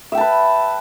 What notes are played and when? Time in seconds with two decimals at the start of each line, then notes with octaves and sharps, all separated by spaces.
0.12 E5
0.15 G5
0.18 A5
0.20 B4